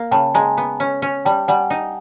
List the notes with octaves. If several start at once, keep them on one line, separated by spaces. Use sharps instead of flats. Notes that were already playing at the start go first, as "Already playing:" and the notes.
Already playing: A#3
C#3 G5 A5
G#3 G#5 A#5
B3
C#4
C#4
G3 G5 A5
G3 F#5 G#5
D#4